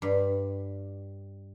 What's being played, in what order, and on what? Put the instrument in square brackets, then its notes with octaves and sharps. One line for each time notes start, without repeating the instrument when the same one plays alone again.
[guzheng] G2